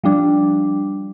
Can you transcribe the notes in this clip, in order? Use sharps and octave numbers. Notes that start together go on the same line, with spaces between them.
F3 G3 D4